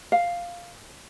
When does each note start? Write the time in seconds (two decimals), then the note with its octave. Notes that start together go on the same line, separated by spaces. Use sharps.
0.12 F5